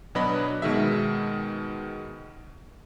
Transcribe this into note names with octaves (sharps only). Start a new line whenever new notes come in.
B2 F#3 D4 B4 D#5 B5
B2 D#3 G#3 E5